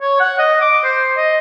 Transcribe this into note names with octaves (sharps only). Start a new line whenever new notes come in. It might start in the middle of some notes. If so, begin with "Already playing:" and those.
C#5
F#5
D#5
D6
C5
D#5